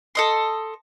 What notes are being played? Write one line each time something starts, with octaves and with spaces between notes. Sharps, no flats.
A4 D#5 C6